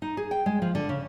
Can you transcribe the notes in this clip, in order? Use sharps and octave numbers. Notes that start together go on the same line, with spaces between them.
D#4
G#4
G5
G#3
F3
D3
C#3